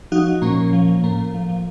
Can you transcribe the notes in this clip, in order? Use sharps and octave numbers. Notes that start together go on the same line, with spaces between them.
F3 D#4 F#4
F3
A#2 A#3 C#4
A#2
F3
F3
A2 A#3
A2
F3
F3